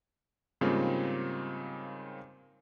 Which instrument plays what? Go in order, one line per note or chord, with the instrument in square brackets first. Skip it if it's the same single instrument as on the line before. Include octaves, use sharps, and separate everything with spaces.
[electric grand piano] G#2 C#3 G3 A#3 C4 F4